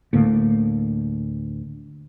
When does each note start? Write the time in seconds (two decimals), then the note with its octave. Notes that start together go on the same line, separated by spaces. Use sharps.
0.13 D2 A2 A#3